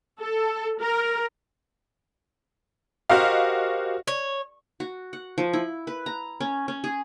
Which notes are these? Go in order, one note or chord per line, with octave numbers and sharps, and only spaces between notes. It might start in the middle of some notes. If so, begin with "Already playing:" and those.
A4
A#4
F#4 G4 A#4 C5 D#5 F5
C#5
F#4
F#5
F3
E4
B4
A#5
C#4
C#4
G#4